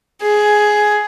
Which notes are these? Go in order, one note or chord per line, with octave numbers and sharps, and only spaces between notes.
G#4